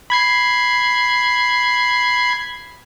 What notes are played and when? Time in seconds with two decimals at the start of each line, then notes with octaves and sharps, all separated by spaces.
0.10 B5 G#6 C7